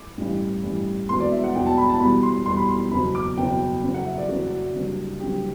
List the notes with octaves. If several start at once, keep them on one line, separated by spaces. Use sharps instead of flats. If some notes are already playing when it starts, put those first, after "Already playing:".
Already playing: D6
A1 G2 E3 G3
A1 G2 E3 G3
E1 E2 B2 F#3 C6
D5
E5
F#5
E1 E2 B2 F#3 G5
A5
B5
A5
E2 B2 G3 B5
C6
E2 B2 G3 C6
B5
C6
F#1 E2 B2 F#3 B5
D6
F#1 E2 B2 F#3 G5
F#1 F#2 F#3
F#5
E5
D5
F#1 F#2 F#3 F#4
F#1 F#2 D3 G3
F#1 F#2 D3 G3 G4